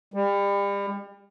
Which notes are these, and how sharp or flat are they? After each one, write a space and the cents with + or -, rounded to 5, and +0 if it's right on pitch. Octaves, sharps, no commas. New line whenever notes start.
G3 +35